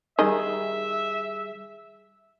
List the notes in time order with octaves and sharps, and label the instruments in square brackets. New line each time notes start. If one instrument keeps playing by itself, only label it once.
[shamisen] D#3 D#4 D#5 [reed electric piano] G3 G#4 [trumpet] E5